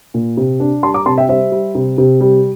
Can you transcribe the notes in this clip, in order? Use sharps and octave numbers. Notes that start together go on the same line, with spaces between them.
A#2
C3
D4
G3 A5 C6
A#5 D6
C3 A5 C6
E5 G5
G3 C5 E5
G3
C3
C3
G3